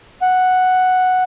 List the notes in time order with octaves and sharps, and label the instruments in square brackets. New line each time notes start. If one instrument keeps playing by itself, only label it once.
[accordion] F#5